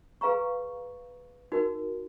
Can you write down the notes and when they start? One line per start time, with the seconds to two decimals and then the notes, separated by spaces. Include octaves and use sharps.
0.21 G#4 B4 F5 A#5 C#6
1.52 D#4 F#4 A#4